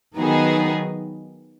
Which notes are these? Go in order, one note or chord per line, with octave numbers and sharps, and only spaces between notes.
D#3 F#3 B3 D#4 G#4